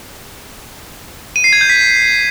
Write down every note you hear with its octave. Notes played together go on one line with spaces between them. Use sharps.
D#7
C7
G#6
G6
B6